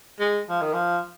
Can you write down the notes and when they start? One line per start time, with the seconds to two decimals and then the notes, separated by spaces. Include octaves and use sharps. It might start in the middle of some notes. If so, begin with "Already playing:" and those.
0.19 G#3
0.49 F3
0.62 D#3
0.74 F3